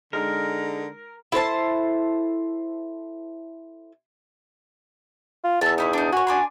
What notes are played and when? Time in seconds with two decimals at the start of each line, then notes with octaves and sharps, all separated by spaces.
0.13 D3 G#3 D#4 A#4
1.32 E4 A4 C5 A5
5.44 F4
5.61 E2 E5 A5
5.78 D#4 E4 C#5
5.93 D4 D#4
6.12 F#4 C#5 G#5
6.27 D4 G#5 C6